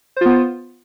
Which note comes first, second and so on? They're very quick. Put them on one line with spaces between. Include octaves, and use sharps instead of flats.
C5 F4 B3